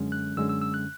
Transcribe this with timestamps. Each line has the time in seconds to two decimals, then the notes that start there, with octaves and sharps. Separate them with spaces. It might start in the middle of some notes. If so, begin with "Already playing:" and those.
Already playing: F#2 D3 G#3 C#4
0.12 F#6
0.37 F#2 D3 G#3 C#4 E6
0.49 E6
0.62 E6
0.74 F#6